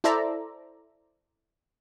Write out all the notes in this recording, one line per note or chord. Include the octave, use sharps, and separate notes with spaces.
E4 A4 C5 D5 E5 A#5